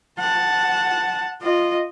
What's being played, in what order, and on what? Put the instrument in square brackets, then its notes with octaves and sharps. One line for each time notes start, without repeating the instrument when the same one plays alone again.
[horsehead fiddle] F#5 A5
F4 D#5